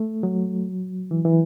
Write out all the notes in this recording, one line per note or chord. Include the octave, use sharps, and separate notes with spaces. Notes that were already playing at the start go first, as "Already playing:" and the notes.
Already playing: A3
F#3
E3
E3